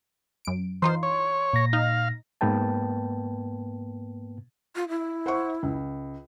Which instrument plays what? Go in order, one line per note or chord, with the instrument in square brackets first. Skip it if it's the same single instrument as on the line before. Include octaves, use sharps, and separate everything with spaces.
[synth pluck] F#2 D7
[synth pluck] E3 D#4 F4 [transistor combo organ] C5 [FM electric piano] C6
[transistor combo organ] C#5
[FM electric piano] A#2 A#6
[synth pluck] D#4 [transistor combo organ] F5
[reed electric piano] G#2 A#3 B3 B4 G5 A5
[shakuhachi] F4
E4
[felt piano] C5 F#5 C#6
C#2